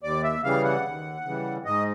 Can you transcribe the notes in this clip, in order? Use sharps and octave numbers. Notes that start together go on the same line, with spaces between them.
D#2 D5
E5
C#3 E3 G3 F5
F#5
D#2
C#3 E3 G3
G#2 D#5